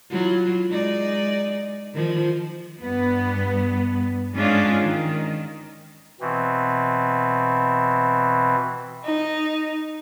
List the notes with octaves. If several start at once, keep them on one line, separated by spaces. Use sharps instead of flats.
F#3 E4 F4
G#3 D#4 D5
D#3 F3
G2 B3
G#2 G#3 C#4 D4 F4
D#3
B2 E3 C4
D#4